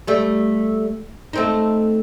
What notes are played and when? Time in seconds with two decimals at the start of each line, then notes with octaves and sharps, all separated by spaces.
0.07 G3 A3
1.33 A3 C4 D#4